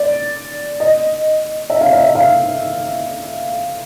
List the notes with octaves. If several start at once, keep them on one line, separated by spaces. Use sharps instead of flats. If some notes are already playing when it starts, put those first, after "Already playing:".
Already playing: D5
D#5
E5
F5
E5
E5
F5